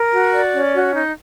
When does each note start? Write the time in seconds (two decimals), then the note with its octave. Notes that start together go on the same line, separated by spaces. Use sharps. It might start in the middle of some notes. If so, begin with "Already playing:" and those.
Already playing: A#4
0.12 F#4
0.33 D5
0.53 C#4
0.74 F#4
0.94 D#4